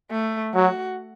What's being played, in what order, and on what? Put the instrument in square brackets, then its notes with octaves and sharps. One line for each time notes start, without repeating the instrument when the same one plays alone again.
[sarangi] A3
[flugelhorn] F#3 [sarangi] F#4